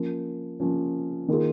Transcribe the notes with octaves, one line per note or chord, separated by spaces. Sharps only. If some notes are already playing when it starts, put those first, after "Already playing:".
Already playing: F3 A#3 C#4
F3 A#3 C#4
D#3 A#3 F4 G#4